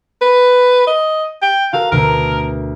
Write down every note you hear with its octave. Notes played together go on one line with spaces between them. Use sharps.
B4
D#5
G5
F#4 A4 A#4 F5
D2 B2 D3 A#4